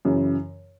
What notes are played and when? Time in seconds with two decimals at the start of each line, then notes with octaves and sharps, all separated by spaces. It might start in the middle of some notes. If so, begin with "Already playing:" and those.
0.05 F#2 C#3 E3